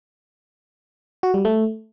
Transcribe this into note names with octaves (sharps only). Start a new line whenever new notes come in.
F#4
G3
A3